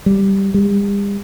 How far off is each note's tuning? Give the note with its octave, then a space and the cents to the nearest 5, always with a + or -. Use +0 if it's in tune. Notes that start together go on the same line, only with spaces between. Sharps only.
G3 +0
G3 +45